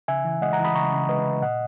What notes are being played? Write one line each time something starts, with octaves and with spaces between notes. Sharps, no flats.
C#3 E5 G#5
E3
G#3 D#5 F#5
F#5 A#5
E3
B5 D#6
C#3 A#5 C#6
C#3
G#3 B4 D#5
C#3
A#2 D#5 F#5